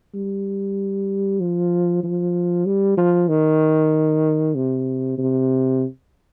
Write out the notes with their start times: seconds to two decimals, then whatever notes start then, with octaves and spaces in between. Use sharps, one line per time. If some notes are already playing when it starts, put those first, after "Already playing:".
0.14 G3
1.40 F3
2.04 F3
2.66 G3
2.98 F3
3.29 D#3
4.55 C3
5.18 C3